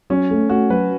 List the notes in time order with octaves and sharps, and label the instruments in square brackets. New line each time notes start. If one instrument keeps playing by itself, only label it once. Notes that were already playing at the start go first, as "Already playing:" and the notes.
[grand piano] F#3 [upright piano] C#4
[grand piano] A3
[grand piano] A3 [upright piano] F#4
[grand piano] F#3 [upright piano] B4